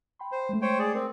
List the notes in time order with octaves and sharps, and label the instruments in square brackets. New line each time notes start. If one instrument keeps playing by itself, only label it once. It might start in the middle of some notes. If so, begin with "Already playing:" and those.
[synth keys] G5 B5 C6
[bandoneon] C5
[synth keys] G#3 A3
[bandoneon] C5 C#5 G5
G#4 D5
[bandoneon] C4 [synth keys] A#4